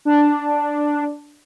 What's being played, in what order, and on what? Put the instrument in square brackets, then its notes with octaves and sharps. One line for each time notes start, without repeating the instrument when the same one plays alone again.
[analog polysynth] D4